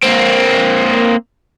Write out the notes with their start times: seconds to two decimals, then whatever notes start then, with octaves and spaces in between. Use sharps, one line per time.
0.03 A#3 C4